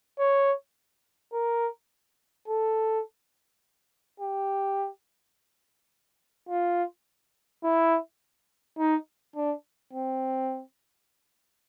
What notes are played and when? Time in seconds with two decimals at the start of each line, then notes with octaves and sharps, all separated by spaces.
0.19 C#5
1.34 A#4
2.48 A4
4.20 G4
6.49 F4
7.64 E4
8.79 D#4
9.36 D4
9.94 C4